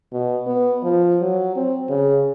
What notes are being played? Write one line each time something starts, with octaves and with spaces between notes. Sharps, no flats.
B2
B3
F3
F#3
C4
C#3